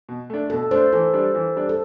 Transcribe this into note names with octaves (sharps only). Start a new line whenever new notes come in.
B2
A3 D4
B2 A4
A3 D4 C5
E3 A4
G3 D4
E3
G3 D4
A4